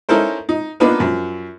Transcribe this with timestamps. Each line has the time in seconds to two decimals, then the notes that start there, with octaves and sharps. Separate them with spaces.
0.09 C#4 D#4 E4 A4 A#4 C5
0.49 D#4
0.80 A#3 B3 D4 D#4 F4 B4
1.00 F#2 F3